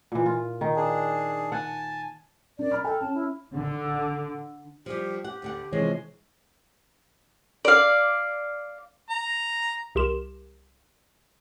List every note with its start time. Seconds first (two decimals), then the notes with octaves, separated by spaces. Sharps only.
0.12 A#2 E3
0.26 F4
0.61 D#3
0.76 D4 G#4
1.52 F#5 G#5 A5
2.59 D4 A#4 D5
2.71 A#5 B5 F6
2.84 A4 G5
3.01 C#4 A5
3.14 E4
3.55 D3
4.86 F3 G3 G4
5.24 G4 F#5
5.42 D2 D3 F#5
5.73 C3 E3 F3 G#3 C#5
7.65 D5 F5
9.10 A#5
9.95 C2 G4 A#4 C6 E7